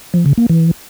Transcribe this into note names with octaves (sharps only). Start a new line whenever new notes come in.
F3
C#3
A#3
E3